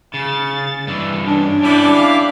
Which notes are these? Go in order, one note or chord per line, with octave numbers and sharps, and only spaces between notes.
C#3 A6
G2 E3
C#4 D4
G3 B3 E4 G4 D5
F5